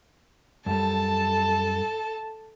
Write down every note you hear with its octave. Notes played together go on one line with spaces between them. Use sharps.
F#2 G3 A4 A5